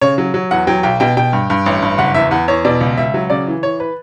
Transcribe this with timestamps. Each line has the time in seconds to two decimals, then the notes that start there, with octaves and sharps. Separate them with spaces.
0.01 C#3 C#5
0.18 F#3
0.34 F#3
0.51 E2 F#5
0.67 F#3 G5
0.83 B1 G5
1.00 B2 G5
1.17 B2 G5
1.33 G2
1.50 G2
1.66 A1
1.82 G2
1.98 F#1 F#5
2.14 E2 E5
2.31 E2 F#5
2.48 E2 C#5
2.65 B2 D5
2.81 C#2
2.97 C#2 E5
3.14 F#3
3.30 C#3 D5
3.47 E3
3.63 E3 C#5
3.80 B4